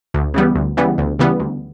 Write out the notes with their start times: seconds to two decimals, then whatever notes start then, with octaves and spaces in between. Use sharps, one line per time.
0.14 D2
0.34 C#3 E3 G3 B3
0.55 D2
0.77 C#3 E3 G3 B3
0.98 D2
1.19 C#3 E3 G3 B3
1.40 D2